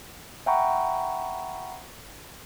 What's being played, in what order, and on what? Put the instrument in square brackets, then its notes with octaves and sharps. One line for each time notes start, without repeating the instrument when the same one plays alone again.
[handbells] E5 F#5 G5 A#5 B5 C#6